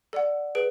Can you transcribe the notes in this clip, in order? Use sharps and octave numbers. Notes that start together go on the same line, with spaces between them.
A4 D5 F#5
G#4 B4 D7